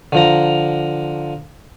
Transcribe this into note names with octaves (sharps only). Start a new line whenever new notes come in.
D3 F3 A#5